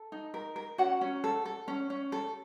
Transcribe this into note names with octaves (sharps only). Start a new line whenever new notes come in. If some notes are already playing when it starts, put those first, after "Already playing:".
Already playing: A4
D#4
A#4
A#4
C#4 F#4 F#5
C#4
A4
A4
C#4
C#4
A4